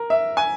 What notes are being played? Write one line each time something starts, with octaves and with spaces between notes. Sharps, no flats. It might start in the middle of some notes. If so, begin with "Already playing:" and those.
Already playing: A#4
E5
G#5